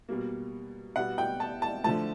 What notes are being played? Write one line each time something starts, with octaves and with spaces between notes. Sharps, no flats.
B2 G3 A#3
B2 G3 B3 F#5
G5
A5
A5
D3 F3 A3 A5